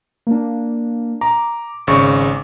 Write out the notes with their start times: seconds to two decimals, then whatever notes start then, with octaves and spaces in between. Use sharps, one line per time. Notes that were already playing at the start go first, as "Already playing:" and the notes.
0.27 A#3 D4
1.21 A#5 D6
1.87 G#1 C#3 C#6